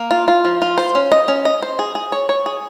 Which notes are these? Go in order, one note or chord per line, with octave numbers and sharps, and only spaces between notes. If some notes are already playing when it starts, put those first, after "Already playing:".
Already playing: A#3
F4
F4
F3
F4
C5
C#4
D#5
C#4
D#5
C5
G#4
G#4
C#5
C#5
G#4